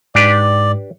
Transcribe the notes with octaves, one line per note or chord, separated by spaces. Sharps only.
G#2 D4 G4 B4 D5